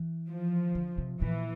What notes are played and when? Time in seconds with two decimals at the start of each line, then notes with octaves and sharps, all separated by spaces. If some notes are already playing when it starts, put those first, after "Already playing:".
Already playing: E3
0.29 F3
0.75 D3
0.98 C3
1.21 A#2 E3